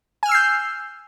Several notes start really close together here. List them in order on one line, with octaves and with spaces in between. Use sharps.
G#5 F6 E6 C7 G6